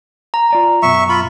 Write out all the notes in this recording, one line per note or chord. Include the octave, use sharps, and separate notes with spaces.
A#5
F4 D5 G#5
F#2 B2 E5 C#6
F4 B5